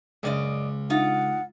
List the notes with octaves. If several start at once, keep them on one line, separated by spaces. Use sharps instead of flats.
C#2 F#2 D5 D#5
D#4 F4 F#5